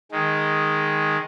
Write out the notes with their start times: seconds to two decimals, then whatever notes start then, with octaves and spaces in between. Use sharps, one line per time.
0.12 D#3 G#3